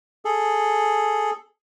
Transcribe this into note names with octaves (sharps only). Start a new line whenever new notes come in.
G#4 A4